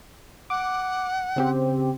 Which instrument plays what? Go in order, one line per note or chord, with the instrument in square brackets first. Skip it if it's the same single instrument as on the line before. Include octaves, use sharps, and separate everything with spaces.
[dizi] F#5 [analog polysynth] D6
[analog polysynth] C#3 C4 G4